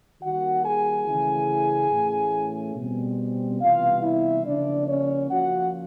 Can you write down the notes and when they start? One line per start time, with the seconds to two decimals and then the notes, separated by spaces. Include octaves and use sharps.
0.22 D#3 G3 A#3 F#4 F#5
0.64 G#4 G#5
1.06 C#3 E3 A3 C#4 E4
1.91 A2 E3 A3 C#4
2.76 B2 G3 C4
3.61 C3 E3 G3 B3 F4 F5
4.03 E4 E5
4.45 C#3 F3 A#3 D4 D5
4.88 C#4 C#5
5.30 F3 A#3 C#4 F4 F#4 F#5